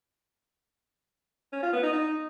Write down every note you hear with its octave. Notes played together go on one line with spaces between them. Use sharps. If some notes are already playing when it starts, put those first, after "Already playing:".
C#4
F4
B3
D#4
D#4